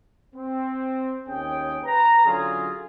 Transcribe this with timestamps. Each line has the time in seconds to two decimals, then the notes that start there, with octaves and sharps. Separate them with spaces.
0.35 C4
1.28 D#2 C#4 G#4 G5
1.85 B4 A#5
2.26 D3 F#3 C#4 F4 G#4